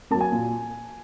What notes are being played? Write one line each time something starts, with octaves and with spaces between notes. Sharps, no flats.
F#3 A#3 A5
G#5
A#2